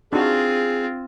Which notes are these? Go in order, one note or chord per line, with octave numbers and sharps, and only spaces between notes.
C4 D4 D#4 F4 F#4 G#4